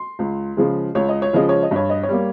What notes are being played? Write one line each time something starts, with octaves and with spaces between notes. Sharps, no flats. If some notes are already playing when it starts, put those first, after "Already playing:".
Already playing: C6
C#2
C#3 F3 G#3
C#2 C#5
D#5
C#5
C#3 F3 G#3 D#5
C#5
D#5
G2 C#5
D#5
C#5
G3 A#3